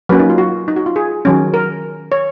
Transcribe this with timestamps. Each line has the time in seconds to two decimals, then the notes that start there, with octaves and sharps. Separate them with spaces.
0.09 F#3 A#3 C#4 B4
0.19 D#4
0.30 F4
0.38 F#4
0.68 D#4
0.76 F#4
0.86 F4
0.96 G#4
1.25 D#3 F#3 C#4
1.54 A#4
2.12 C#5